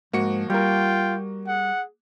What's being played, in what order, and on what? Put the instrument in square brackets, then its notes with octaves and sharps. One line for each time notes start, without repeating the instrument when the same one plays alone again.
[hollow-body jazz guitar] G#2 [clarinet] F3 [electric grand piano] A#3 F#4 C#7
[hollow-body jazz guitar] G3 A#4 [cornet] F4 [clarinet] G5
[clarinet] G#4 [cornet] F#5